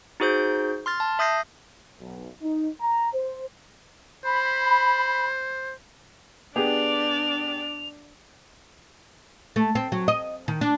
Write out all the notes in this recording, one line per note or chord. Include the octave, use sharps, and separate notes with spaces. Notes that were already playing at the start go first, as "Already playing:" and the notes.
D#4 F#4 G#4 C5 G6
C6 F6 A6
A5
E5 D#6 G6 A#6 C7
B1
D#4
A#5
C5
C5 B5
B3 D4 G4 G#4 D5 F7
A3
C4
F#3
D#5
D#3
D4